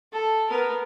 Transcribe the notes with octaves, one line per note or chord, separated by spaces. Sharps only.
A4
B3 A#4